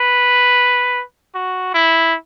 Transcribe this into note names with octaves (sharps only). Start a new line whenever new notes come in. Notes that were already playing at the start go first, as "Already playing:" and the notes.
Already playing: B4
F#4
E4